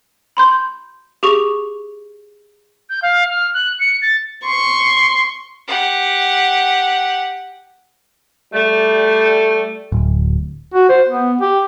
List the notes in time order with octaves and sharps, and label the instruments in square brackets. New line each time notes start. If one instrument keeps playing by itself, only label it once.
[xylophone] B5 C6 G6
G4 G#4 C#6 F7
[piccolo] G6
F5
F6
F#6
C#7
A6
[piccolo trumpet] C6 [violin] C#6
[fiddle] G4 F#5
[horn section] G3 A3
[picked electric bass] D1
[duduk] F#4
C5
B3
G4